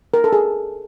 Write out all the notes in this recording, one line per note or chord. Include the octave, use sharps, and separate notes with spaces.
A#4
A4
G#4